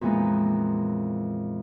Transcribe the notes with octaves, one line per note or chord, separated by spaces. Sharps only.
F2 A#2 E3 G#3 B3 D#4